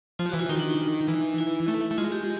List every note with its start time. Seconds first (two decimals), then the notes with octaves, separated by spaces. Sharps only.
0.19 F3 F4
0.29 F#4
0.34 E3
0.39 F4
0.49 D#3 D#4
0.59 D4
0.69 D#4
1.08 E3
1.38 E4
1.68 A3
1.91 A3
1.98 G#3 F4
2.12 G4